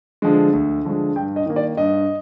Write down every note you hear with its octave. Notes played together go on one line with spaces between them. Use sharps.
D3 F3 G#3
D2
D3 F3 G#3
G2 G5
D#5
D#3 A#3
D5
G2 D#5